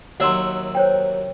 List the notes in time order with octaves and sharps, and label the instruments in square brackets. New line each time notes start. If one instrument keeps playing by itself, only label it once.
[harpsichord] D#2 F#3 E5 [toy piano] F#5 C6
[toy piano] C5 C#5 G5